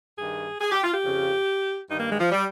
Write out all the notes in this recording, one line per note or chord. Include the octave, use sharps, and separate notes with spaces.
G2 D#3 G#4
G#4
G4
F4
G4
F2 C#3
G2 D#3 D#4
A#3
G#3
F3
G3